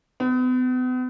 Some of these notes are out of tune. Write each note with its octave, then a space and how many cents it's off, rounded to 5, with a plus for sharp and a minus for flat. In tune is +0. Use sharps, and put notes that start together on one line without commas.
B3 +40